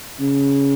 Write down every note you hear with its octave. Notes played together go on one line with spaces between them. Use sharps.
C#3